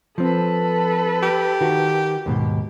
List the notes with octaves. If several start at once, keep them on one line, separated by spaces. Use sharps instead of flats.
F3 C4 A4 B4
G4
D#3 F#4
D#2 G#2 B2